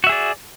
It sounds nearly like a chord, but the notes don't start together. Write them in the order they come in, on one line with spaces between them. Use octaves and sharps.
F#4 E5 G#4 D5